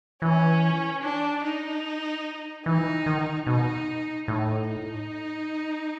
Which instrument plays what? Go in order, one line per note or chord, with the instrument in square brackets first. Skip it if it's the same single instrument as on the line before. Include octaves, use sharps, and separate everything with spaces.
[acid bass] E3 [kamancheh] C#4
[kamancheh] D4
D#4
[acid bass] E3 [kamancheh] D#4
[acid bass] D#3
[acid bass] B2 [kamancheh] D#4
[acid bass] A2 [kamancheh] D#4
[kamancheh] D#4